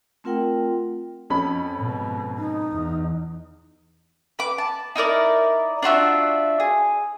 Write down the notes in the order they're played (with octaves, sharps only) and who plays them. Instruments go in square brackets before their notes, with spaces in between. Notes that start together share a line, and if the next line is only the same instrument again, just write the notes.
[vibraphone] A3 C4 F4 A#4 F#5 G5
[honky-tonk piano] F2 C#4 B5
[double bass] G#2 B2
[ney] D#4
[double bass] E2
[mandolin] B4 D6
A5
D#4 E4 A#4 D5
D4 F4 F#4 E5
G#4